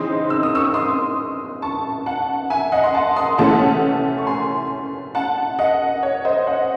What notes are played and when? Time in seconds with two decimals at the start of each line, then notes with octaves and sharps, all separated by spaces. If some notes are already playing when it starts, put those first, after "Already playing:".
Already playing: C#3 E3 C4 D#4 C6 D#6
0.30 E6
0.43 D#6
0.55 C#6 E6
0.74 C6 D#6
1.62 A5 C#6
2.06 F#5 A5
2.50 E5 G#5
2.72 D#5 F#5
2.84 C6
2.94 F#5 A5
3.16 C6 D#6
3.38 C3 E3 A3 C#4 F#5 A5
4.18 C#6
4.27 G#5 C6
5.15 F#5 A5
5.59 D#5 F#5
6.03 C#5
6.25 C5 D#5
6.47 D#5 F#5